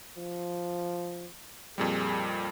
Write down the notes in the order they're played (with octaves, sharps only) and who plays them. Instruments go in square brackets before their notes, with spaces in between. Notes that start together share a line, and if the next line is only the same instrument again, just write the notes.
[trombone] F3
[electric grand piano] F2 A#2 G3 [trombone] G#4